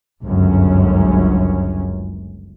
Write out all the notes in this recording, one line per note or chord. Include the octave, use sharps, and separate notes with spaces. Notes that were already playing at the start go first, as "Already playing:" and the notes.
G1 C#2 F#2 C#4